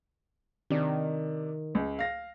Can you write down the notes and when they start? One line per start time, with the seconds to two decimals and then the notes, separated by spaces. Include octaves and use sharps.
0.70 C3 D#3 D4
1.75 C#2
1.99 F5 A#6